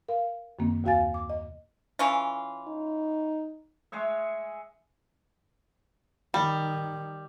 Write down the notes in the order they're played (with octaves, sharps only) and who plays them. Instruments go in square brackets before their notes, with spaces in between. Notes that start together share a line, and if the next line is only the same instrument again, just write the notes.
[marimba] A#4 F5
F#2 D#3 A#3 C4
D#2 C3 F#4 F5 G#5 A6
D6
D#5
[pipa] E3 C#4 F4
[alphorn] D#4
[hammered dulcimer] G#3 G#4 C#5 E5
[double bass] D#3 [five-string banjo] G3